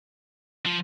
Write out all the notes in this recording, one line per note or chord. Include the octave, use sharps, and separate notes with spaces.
F3